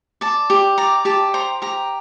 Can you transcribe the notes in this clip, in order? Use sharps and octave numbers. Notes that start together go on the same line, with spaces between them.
D5 A5
G4
D5 A#5
G4 A5
C5 A#5
G4 A#5